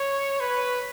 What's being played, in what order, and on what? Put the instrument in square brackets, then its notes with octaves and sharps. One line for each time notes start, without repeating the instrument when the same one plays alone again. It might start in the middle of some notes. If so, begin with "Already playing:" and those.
Already playing: [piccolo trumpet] C#5
B4